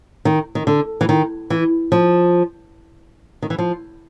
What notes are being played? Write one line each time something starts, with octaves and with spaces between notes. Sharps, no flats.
D#3
D#3
D3
E3
D#3
E3
F3
D#3
E3
F3